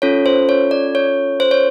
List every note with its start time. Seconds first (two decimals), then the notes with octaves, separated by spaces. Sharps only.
0.02 C#4 F4 A4 C#5
0.26 C5
0.49 C#5
0.71 D5
0.95 C#5
1.40 C5
1.51 C#5